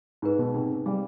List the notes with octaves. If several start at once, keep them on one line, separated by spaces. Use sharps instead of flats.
G#2 D#4 G#4 B4
B2
C3 D#4 G#4 B4
G3 C5 F5 G#5 D6